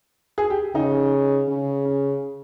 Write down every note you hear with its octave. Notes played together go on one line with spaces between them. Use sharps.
G#4
G4
C#3 D#4
C#3
C#4